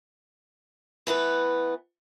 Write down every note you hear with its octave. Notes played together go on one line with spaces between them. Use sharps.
E3 A3 B3 B4